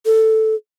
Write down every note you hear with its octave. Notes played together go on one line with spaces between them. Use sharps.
A4